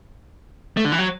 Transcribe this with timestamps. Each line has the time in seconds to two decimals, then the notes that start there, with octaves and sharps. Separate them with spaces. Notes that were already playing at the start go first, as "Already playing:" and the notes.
0.77 A3
0.85 D3
0.92 E3
0.98 F#3